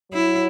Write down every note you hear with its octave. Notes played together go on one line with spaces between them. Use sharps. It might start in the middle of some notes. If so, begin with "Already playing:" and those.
F#3 E4